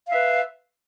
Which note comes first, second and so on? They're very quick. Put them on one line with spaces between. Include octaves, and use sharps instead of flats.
F5 E5 B4